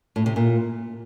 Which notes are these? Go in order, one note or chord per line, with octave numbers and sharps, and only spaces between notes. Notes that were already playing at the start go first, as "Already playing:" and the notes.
A2
C3
A#2